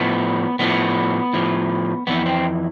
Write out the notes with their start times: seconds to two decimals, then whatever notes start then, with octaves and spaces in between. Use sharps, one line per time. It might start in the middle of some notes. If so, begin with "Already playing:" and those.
Already playing: A2 F3 B3
0.59 A2 F3 B3
1.33 A2 F3
2.07 F2 E3 B3
2.26 C4